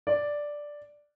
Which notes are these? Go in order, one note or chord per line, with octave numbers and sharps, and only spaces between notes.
D5